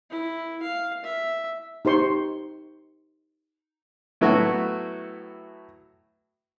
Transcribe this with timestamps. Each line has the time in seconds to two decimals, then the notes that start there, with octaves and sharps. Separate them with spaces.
0.10 E4
0.62 F5
1.04 E5
1.85 D#4 G4 C5 C6 C#6
4.21 A2 F#3 A3 B3 E4 F#4